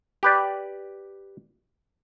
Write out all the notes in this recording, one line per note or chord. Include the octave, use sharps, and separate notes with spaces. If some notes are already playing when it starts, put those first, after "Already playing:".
G4 B4 D5